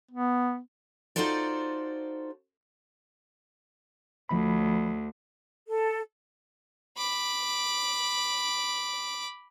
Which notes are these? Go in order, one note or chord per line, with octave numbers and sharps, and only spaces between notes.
B3
D#4 F4 F#4 A4 C5 D5
D2 F3 B5
A4
B5 D6